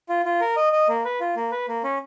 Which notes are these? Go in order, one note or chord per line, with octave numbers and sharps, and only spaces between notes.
F4
F4
A#4
D#5
D#5
A#3
B4
F4
A#3
B4
A#3
C#4